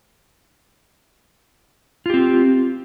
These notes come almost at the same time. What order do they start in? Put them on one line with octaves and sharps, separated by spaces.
F4 G4 C4